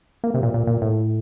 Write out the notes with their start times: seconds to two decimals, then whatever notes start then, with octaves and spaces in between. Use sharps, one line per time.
0.24 A#3
0.34 C3
0.43 A#2
0.54 A#2
0.67 A#2
0.82 A2